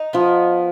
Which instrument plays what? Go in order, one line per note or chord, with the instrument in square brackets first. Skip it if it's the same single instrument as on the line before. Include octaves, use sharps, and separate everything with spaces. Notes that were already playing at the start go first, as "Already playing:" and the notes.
Already playing: [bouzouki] D#4
[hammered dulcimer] F3 [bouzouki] B3